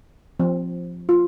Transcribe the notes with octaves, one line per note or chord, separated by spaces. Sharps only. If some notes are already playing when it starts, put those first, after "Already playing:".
F3 C4
F4